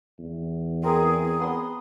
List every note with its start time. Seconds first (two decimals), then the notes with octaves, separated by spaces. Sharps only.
0.19 E2
0.83 C4 G#4 A#4
1.40 B3 C6 D#6